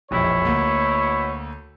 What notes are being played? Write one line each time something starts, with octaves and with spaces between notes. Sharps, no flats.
E1 A#1 F2 B2 E4 C#5
D2 A#3